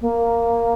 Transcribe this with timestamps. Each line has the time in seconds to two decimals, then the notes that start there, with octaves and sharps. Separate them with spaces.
0.01 A#3